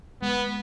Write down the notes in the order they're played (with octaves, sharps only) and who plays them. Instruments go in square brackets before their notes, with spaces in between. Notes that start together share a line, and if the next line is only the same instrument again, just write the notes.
[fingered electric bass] G#3 [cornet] B3